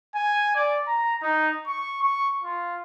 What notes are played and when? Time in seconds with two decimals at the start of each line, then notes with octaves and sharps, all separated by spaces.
0.15 G#5
0.55 D5
0.87 A#5
1.22 D#4
1.67 C#6
2.02 C#6
2.43 F4